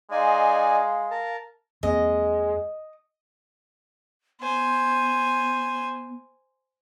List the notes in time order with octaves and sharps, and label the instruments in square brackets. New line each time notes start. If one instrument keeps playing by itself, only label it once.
[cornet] G#3 [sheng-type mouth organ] D#4 D5 G#5 [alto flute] F5
[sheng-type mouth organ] A#4 A5
[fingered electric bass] E2 A#3 C4 [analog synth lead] G#3 [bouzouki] D#5
[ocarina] B3 [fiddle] C5 G#5